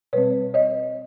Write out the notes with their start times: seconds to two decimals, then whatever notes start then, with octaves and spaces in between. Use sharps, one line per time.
0.13 B2 G3 C4 B4 C#5
0.54 C#5 D#5